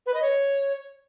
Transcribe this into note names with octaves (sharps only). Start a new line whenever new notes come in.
B4
D#5
C#5